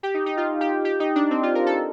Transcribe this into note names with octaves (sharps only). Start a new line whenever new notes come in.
G4
D#4
D#4
F4
G4
G4
D#4
D4
C4
F4
A#4
A4